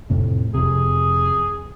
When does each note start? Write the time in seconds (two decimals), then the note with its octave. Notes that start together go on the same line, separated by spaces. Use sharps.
0.10 F2 A2 C3
0.54 F2 C3 G#4